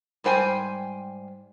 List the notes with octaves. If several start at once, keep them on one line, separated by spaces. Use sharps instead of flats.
G#2 G3 C5 G5 G#5